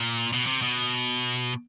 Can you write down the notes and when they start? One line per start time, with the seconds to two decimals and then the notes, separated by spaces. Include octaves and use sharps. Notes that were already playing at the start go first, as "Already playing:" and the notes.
Already playing: A#2
0.33 B2
0.47 C3
0.62 B2